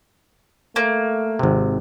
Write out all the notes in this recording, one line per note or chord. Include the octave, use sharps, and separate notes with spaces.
A3 A#3
G#1 C3